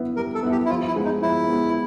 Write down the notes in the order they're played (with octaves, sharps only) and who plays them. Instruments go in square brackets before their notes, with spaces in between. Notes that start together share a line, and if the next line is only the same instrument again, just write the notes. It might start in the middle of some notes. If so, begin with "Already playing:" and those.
Already playing: [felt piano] B3 E4
[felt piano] G3 [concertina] A#4
[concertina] A4
[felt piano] B3 E4
[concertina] G4
E4
[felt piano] F3 [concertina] F4
[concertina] E4
[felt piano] G#3 B3
[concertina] D#4
[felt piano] F3 [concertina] E4
[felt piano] G#3 B3